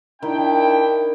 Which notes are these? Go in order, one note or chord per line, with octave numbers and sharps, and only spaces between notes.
D#3 D4 E4 G5